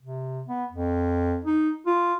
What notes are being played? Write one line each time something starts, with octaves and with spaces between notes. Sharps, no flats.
C3
B3
F2
D#4
F4